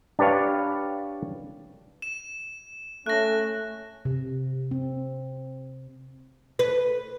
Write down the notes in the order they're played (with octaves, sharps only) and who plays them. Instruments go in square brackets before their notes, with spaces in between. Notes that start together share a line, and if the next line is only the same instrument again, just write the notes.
[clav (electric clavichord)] D4 G4 B4 C#5 F5
[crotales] E7
[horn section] A3 C#4 [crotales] F#6 A#6
[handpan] C3
C4
[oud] B4